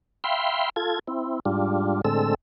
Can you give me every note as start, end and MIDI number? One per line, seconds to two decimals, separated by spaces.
0.24 0.70 76
0.24 0.70 77
0.24 0.70 79
0.24 0.70 83
0.24 0.70 84
0.76 0.99 65
0.76 0.99 69
0.76 0.99 92
1.08 1.40 60
1.08 1.40 64
1.45 2.02 44
1.45 2.02 55
1.45 2.02 62
1.45 2.02 65
2.05 2.34 45
2.05 2.34 50
2.05 2.34 56
2.05 2.34 60
2.05 2.34 69
2.05 2.34 88